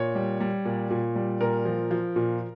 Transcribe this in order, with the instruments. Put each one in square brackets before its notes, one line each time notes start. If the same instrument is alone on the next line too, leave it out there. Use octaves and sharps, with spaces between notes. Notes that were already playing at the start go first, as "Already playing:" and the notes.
Already playing: [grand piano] A#2 C#5
G3
G3
A#2
A#2
G3
A#2 A#4
F3
F3
A#2